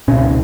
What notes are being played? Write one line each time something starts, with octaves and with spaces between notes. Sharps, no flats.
C#2 B2 C#4